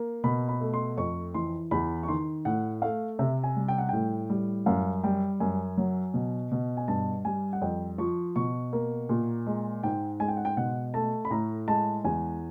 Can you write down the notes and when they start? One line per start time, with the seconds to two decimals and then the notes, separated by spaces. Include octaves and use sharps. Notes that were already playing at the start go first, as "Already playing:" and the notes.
Already playing: A#3
0.24 B2 B5
0.49 B5
0.61 A3
0.74 C6
0.97 F2 C#6
1.34 E3 C6
1.71 E2 B5
2.03 C#6
2.08 D#3 C6
2.45 A2 F#5
2.82 A3 F5
3.19 C3 E5
3.44 G#5
3.56 G3
3.68 G5
3.78 F#5
3.89 A2 G5
4.30 G3
4.66 F#2 F5
5.04 G3 G5
5.40 F#2 G#5
5.77 F#3
6.14 B2
6.51 B2
6.77 G#5
6.88 G2 A5
7.25 G3 G#5
7.53 F#5
7.62 F2 G5
7.98 F3 C#6
8.36 B2 C#6
8.73 A#3
9.09 A#2
9.46 G#3
9.83 G#2 G5
10.20 G#3 G#5
10.28 G5
10.37 F#5
10.45 G5
10.57 B2 F#5
10.94 A3 A5
11.25 B5
11.31 A2 A#5
11.68 G#3 A5
12.04 E2 G#5